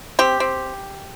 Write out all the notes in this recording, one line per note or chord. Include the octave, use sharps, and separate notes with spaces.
C4 G4
C4